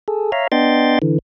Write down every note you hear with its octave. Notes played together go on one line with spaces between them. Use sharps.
G#4 A4
C#5 E5 F5 A#5
B3 D4 D#5 G5 C6 A6
D3 E3